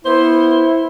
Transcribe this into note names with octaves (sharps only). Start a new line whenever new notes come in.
B3 E4 C5